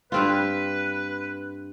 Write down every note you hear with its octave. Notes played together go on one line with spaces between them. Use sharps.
G2 C4 F4 B4